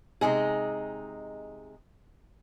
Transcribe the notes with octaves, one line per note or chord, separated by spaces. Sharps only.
C3 G#3 D#4 G#4